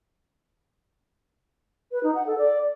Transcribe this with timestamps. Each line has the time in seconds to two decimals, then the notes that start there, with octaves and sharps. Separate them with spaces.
1.92 B4
2.03 D#4
2.15 F#5
2.26 A4
2.38 D5